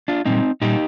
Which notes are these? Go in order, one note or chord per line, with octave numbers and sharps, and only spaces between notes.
D4 F4
A#2 G3 C4 D#4
A#2 G3 D#4 G4